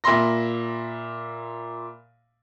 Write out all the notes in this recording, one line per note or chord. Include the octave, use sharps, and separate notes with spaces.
A#2 E5 B5 C6 A#6